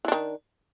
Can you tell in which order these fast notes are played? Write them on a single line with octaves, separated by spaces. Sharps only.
E3 D4 D#3